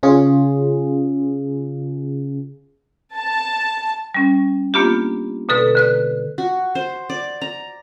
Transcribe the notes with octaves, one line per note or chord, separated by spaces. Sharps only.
C#3 C#4 F4 G#4
A5
G3 C#4
A#3 B3 D4 F4 G4
B2 D3 A4 B4
D3 B4 F#6
F#4
C5
D5
A#5